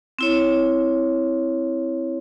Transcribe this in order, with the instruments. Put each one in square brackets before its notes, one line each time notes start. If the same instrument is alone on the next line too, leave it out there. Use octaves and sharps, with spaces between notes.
[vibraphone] C4 E4 C#5